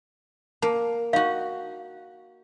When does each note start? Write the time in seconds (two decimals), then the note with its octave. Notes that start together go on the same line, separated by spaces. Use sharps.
0.62 A#3 A5
1.13 D#4 F#4 F5